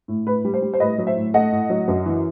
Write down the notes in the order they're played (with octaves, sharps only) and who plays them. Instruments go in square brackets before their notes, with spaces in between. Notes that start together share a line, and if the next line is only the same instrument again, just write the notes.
[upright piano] A2
A2 B4
G3
C5
G3
C5
A2 B4 D#5
F#3
C5 E5
A2
A3 D#5 F#5
A2
F#3
F#2
E3